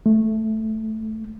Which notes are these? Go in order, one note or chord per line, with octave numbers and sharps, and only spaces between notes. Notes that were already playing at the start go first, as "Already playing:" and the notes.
A3